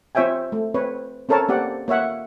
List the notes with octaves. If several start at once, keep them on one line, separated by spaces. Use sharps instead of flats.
C4 F4 C#5 E5 G5 G#5
A3
C4 B4 C#5
C4 C#4 A4 A#4 C#5 A5
A#3 C4 G4 D5 F#5
A#3 C#5 E5 F#5